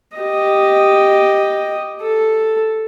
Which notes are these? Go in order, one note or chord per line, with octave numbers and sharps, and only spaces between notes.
G4 D#5
A4